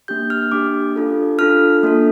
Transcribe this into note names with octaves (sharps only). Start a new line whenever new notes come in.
A#3 D4 G4 G6
F6
A#3 D4 G4 D6
D4 F4 A4
D4 F4 A4 F6
A#3 D4 A4